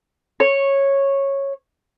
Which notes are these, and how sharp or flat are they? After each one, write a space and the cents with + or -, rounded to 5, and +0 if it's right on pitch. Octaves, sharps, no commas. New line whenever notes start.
C#5 -10